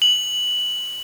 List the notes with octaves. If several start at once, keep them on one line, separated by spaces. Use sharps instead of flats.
F#7